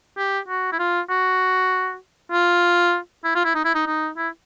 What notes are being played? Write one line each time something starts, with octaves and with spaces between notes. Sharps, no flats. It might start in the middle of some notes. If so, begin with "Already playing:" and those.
G4
F#4
E4
F4
F#4
F4
E4
F4
E4
D#4
E4
D#4
D#4
E4